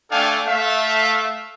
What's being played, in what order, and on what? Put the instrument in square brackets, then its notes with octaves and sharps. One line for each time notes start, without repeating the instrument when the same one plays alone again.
[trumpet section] A3 D4 A4 F5 G5 G#5
A3 E5 F5